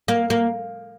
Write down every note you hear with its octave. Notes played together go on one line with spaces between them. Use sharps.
A#3
A#3